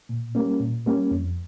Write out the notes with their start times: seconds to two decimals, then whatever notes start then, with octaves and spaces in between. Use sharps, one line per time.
0.09 A#2
0.35 G3 A#3 C#4
0.60 A#2
0.86 G3 A#3 C#4
1.11 F2